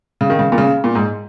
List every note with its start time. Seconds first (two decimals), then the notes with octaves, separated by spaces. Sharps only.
0.21 C#3
0.30 D#3
0.39 C#3
0.52 A#2
0.58 C#3
0.84 A#2
0.95 G#2